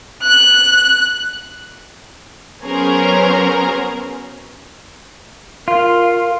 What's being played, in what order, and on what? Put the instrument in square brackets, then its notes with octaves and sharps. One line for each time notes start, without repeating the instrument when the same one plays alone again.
[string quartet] F#6
[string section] F#3 B3 C#4 G#4 A#4 C5
[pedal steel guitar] F4 [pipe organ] A#4